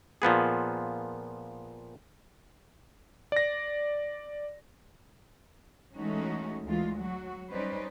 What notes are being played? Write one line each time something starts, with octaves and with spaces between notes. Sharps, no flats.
A#2 F3 B3 G#4
D5 A#6
E3 G#3 A3 C#4 D#4 F#4
D2 E3 G#3 F4
F#3 F#4
G3 C#4 D#4 B4 C5 D5